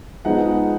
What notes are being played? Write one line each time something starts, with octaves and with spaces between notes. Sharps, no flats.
F3 G#3 B3 D#4 F#5